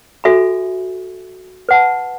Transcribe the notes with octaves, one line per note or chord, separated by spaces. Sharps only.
F#4 A4 E5 G#5 B5
B4 F#5 A5